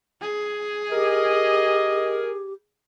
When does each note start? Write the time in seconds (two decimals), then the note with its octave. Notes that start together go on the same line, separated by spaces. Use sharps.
0.21 G#4
0.91 G4 A#4 D#5